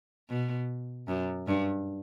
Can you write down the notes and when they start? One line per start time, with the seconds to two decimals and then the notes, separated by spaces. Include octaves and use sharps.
0.30 B2
1.08 F#2
1.47 G2